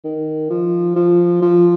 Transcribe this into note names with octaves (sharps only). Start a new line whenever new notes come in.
D#3
F3
F3
F3